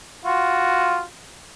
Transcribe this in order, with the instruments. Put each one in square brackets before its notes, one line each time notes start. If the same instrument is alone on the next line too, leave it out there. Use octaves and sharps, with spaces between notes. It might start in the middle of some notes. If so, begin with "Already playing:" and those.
[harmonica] F4 F#4